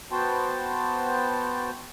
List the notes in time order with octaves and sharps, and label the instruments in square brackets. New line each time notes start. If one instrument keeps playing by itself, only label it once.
[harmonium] B3 F#4 C5 G5 A5